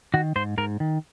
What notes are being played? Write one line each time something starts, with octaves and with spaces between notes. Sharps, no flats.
D#3 F#4
G#2 C5
G#2 A#4
D#3